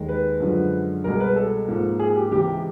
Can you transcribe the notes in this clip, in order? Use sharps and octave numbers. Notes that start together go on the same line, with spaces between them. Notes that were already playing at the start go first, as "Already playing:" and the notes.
Already playing: D#2 D#3 G#3
B4
F#2 D3 F3 G#3
C2 B2 G#3 A#4
B4
A4
G#2 F3 A#3
G#4
G4
C#2 C3 E3 G#3 G4